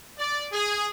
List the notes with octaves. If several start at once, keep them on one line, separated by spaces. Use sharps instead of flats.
D5
G#4